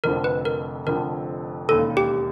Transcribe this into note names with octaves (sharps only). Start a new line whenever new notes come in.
F1 F2 D3 F3 A#4
B4
A#4
F1 F2 D3 F3 A#4
E1 D#2 C#3 A4
G4